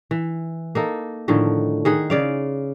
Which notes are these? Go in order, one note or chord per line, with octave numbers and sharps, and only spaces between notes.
E3
A#3 D#4 A4
A2 D3 D#3 F3
D#3 G#4 F#5
C#3 D5 F5